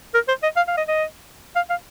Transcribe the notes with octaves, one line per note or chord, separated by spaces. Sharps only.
A#4
C5
D#5
F5
F5
D#5
D#5
F5
F5